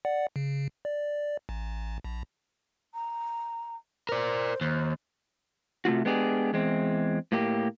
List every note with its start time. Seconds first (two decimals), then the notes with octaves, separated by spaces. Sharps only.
0.05 D5 F#5
0.36 C#3
0.85 D5
1.49 A1
2.04 A#1
2.94 A#5
4.09 A#4 C5 D5
4.61 D#2 C5
5.85 C3 A3 F4 F#4
6.05 G#3 B3 D4 G4 G#4
6.53 E2 G#3 C4
7.32 A2 A#3 G4